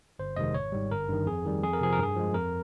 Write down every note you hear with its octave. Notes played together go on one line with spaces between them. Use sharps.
G1 C5
F2 C3 D#3 G#3 D#5
G#1 C#5
G#2 G3
G1 A#4
G2 D#3
F2 G#4
D#3 G3
F2 G#4
A#4
C3 F3 G#4
A#4
G2 G#4
F3 G#3
F2 A#4